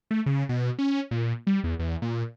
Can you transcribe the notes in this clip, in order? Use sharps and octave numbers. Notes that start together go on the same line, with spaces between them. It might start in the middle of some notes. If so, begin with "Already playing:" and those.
A3
C#3
B2
C#4
A#2
G3
E2
E2
A#2